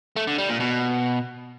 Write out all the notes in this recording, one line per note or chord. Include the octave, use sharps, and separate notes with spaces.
A3
D3
G3
A#2
B2